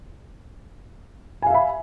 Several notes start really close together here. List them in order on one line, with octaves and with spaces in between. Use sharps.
G#5 F5 E5 B5